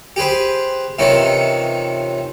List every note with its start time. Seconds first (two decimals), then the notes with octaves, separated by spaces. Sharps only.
0.16 G4 G#4 B4 C5
0.99 C3 D#3 E3 C#4 D#4 F4